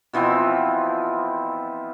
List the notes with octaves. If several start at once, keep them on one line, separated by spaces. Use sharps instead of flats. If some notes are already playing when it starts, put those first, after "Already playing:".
B2 E3 F3 C4